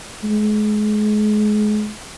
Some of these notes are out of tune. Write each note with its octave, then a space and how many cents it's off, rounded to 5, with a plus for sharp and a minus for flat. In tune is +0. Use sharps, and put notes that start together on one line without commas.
G#3 +30